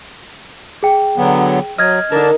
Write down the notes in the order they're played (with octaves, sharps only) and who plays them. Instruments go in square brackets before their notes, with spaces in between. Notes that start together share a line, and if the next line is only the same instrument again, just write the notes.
[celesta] G#4 G5
[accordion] D3 F#3 B3
[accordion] F#3 [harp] D#5 [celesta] F6 G#6
[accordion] D3 D4 A5 [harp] D#4 A#4